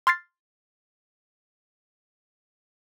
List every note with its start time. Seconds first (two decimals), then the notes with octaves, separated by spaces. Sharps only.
0.07 C6 F6 G#6 A6 C7